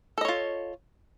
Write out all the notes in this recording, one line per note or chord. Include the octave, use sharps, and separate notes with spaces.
F4 A4 C#5 D#5